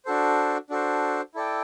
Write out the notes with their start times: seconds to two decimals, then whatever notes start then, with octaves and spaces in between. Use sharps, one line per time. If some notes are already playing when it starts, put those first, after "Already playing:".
0.05 D4 F#4 A4 C5
0.70 D4 F#4 A4 C5
1.35 E4 A4 D5 G5